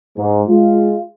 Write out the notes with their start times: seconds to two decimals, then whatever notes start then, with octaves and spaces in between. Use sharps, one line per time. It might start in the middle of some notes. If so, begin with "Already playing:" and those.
0.18 G#2
0.49 G#3 F4